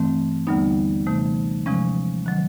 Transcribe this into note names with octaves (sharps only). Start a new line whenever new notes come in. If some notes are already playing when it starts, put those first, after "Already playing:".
Already playing: G2 E3 A3 C4
D#2 D3 G3 B3 D#4
C3 E3 A3
C3 F3 G#3 C#4
D#3 F#3